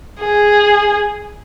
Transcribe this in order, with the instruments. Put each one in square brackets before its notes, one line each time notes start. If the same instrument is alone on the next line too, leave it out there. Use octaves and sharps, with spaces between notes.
[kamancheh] G#4